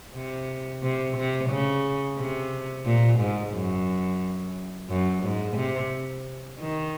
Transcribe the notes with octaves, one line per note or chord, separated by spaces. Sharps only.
C3
C3
C3
C#3
C3
A#2
G#2
F#2
F#2
G#2
C3
D#3